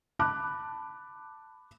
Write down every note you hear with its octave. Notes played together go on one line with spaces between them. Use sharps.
A5 B5 D6 F#6